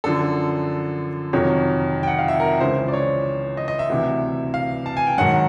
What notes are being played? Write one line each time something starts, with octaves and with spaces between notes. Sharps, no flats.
F#2 D3 F3 A4
F2 C3 D#3 F#3 C#5
G5
F#5
F5
E5
A#4
C#2 C#3 E3 C5
D5
C#5
D#5
D#5
E5
D2 C3 E3
F5
A5
G#5
G5
G#2 D#3 F#3 F#5